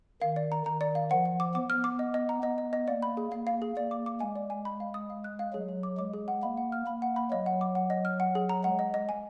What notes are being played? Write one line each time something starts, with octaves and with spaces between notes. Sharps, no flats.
D#3 F5
D5
A#5
D#3 A#5
D5
F5
F3 F#5
F#5
D6
B3 D6
F6
D6
D#5
D#5
A#5
B3 D#5
D#5
D#5
A#3 D5
B5
G#4
A#3 F5
F5
G#4
A#3 D5
D6
D6
G#3 G#5
D5
G#5
B5
F5
D#6
F5
F#6
F5
F#3 G#4
G#4
D6
G#3 D6
G#4
F#5
A#3 B5
F#5
F6
A#3 B5
F#5
B5
F#3 D#5
F#5
D6
F#5
D#5
F6
F#5
G#4
A#5
G#3 F#5
D#5
D#5
G#5